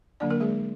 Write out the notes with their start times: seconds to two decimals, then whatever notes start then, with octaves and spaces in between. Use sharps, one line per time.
0.20 D3 F#3 A#3 D4 D5
0.30 A#3 A#4
0.40 G#3 G#4